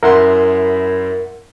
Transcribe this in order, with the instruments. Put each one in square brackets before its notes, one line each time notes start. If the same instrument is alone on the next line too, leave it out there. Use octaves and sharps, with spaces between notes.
[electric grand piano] F#2 E4 C6 [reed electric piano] A#4 E5 F#5